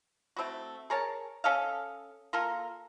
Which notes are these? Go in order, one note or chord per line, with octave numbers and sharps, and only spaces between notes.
A3 C4 E4 F#4
G#4 A#4 C#5 A5
C#4 A4 D#5 F5
A#3 F4 A4 A#4